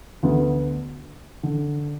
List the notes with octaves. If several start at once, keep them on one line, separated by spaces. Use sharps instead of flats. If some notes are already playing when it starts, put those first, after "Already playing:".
D2 D3 B3
D3